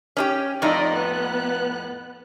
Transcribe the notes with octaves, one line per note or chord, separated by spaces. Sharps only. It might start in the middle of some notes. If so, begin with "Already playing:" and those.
C#4 D4 G4
F2 A2 D#4 D5 D#5
B3 F#6